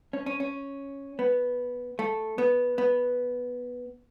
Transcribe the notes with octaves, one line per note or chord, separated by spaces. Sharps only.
C#4
C#4
C#4
B3
A3
B3
B3